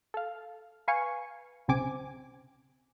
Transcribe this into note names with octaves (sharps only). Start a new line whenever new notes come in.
A4 F5
B4 F5 G#5 C#6
C2 C#3 C4 G#5 D6